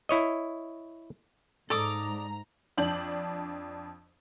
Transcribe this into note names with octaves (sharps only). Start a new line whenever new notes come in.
E4 C#5 D#5
G#2 A4 D5 A#5 D6 D#6
F2 D4 G6 F#7